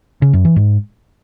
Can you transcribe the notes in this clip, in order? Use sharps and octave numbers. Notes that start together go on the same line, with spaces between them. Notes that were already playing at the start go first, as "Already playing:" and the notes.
C#3
F#2
E3
G#2